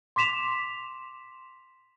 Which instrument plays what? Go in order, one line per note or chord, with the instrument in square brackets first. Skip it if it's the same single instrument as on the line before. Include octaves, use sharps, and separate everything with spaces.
[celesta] C6 D6 B6 E7 F7